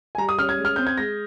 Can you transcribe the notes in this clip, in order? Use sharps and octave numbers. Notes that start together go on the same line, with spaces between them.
G#5
G3 A#5
D#6
C#4 F6
G#6
G#3
F6
C4 G6
G#6
G#3 A#6